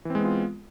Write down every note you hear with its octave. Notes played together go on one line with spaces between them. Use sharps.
E3 G#3 B3 C4 F4